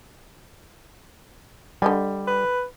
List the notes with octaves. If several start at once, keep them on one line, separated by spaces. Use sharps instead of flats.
D3 G3 D#5 G#5
B4